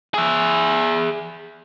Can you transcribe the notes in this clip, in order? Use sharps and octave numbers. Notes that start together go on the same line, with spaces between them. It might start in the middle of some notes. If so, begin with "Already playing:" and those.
G#4 E5